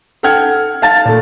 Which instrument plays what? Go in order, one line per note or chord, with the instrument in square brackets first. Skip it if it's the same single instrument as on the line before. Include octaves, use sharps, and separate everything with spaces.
[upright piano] A4 F#5 G5 F6 G#6
F5 A5 A6
A#2 A3